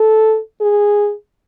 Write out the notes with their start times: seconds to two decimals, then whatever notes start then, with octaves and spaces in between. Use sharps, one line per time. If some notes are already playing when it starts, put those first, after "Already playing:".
Already playing: A4
0.61 G#4